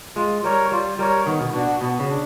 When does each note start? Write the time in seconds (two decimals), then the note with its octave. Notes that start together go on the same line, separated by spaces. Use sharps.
0.16 G#3 F4
0.44 G3 A#4 C#5
0.71 G3 F4
0.99 G3 A#4 C#5
1.26 D#3 B3
1.40 B2
1.54 B2 D4 F#4
1.81 B2 B3
2.00 C#3
2.10 D4